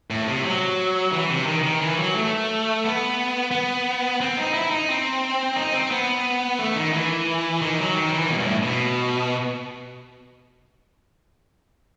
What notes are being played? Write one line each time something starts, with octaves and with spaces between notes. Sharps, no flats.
A2
C3
F#3
E3
C3
D#3
D#3
E3
F#3
A3
B3
B3
C4
D#4
E4
D#4
C4
D#4
C4
B3
A3
D#3
E3
D#3
F#3
D#3
E3
B2
G2
A2
B2